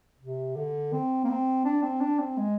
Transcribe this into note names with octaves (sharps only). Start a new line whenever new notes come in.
C3
D3
C4
A#3
C4
D4
C4
D4
C4
G#3